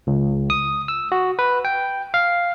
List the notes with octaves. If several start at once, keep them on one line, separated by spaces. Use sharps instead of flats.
C#2
D#6
E6
F#4
B4
G5
F5